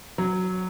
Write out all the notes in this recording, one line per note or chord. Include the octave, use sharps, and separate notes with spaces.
F#3